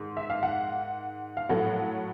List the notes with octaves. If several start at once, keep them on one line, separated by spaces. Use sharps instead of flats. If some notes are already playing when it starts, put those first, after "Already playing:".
Already playing: G#2 D#3
E5
F5
F#5
F5
A2 F#3 A3 F#5